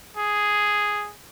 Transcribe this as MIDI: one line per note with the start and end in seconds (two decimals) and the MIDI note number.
0.17 1.11 68